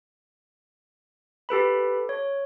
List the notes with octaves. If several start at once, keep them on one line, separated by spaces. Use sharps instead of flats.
G4 A4 B4 B5
C#5